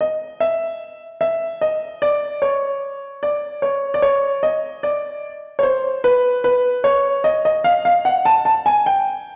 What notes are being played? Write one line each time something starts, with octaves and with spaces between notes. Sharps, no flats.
D#5
E5
E5
D#5
D5
C#5
D5
C#5
D5
C#5
D#5
D5
C#5
C5
B4
B4
C#5
D#5
D#5
F5
F5
F#5
A5
A5
G#5
G5